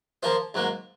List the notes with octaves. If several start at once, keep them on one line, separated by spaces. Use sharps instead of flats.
F3 A#3 F4 C5
G#2 F#3 A#3